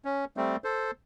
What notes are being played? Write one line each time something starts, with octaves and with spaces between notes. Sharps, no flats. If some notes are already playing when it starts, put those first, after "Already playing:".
C#4
G3 A3 C4
A4 C5